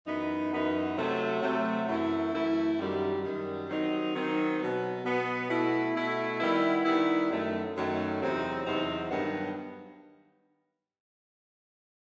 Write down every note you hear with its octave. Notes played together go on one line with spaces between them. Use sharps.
F#2 E3 B3 D#4
F#2 E3 B3 D#4
C3 F#3 A3
C3 F#3 A3
F#2 E3 A3 E4
F#2 E3 A3 E4
F#2 D#3 G3
F#2 D#3 G3
D#3 F#3 C4 D#4
D#3 F#3 C4 D#4
B2 F#3 B3
B2 F#3 B3
B2 A3 E4
B2 A3 E4
D#3 G3 B3 E4
D#3 G3 B3 E4
F#2 D#3 F#3 A3
F#2 D#3 F#3 A3
E2 C3 F#3 C4 D#4
E2 C3 F#3 C4 D#4
G2 D#3 F#3 B3